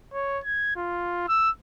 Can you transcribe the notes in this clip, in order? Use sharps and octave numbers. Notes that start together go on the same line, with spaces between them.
C#5
G#6
F4
E6